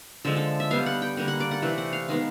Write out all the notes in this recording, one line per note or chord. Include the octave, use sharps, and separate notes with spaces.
D3 F3 G#3 A4
A4
E5
D3 G3 B3 F5
F#5
G5
D3 G3 A#3 F#5
F#5
D5
F#5
C3 E3 A3 F#5
F#5
F5
D#3 G#3 B3 F5